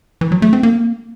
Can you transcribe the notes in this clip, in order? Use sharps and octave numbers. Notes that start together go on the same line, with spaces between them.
E3
F#3
A3
C4
A#3